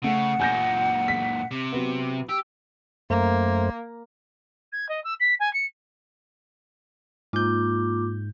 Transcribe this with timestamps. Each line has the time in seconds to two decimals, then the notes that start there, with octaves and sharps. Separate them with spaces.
0.04 C#3 A3 F#5
0.40 F#2 A#2 G#5 G6 A#6
1.08 B6
1.51 C3
1.73 F#3 B3
2.29 G4 E6
3.10 F#2 A3 A#3 C5
4.72 G#6
4.89 D#5
5.04 E6
5.20 B6
5.39 G#5
5.53 C#7
7.33 G#2 A#3 F4 D6 G6